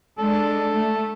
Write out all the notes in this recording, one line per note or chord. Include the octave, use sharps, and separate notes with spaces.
G#3 D4 A4
A3